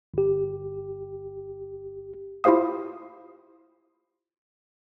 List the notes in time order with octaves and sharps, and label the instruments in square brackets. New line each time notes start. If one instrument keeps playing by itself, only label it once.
[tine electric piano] G1 G4
[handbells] E4 F4 G4 C5 F5 D#6